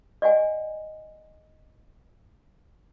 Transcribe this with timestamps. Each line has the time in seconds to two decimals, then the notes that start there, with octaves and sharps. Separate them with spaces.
0.22 D5 D#5 F#5 G#5